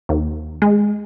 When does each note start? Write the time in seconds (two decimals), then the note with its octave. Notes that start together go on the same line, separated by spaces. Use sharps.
0.09 D#2
0.62 G#3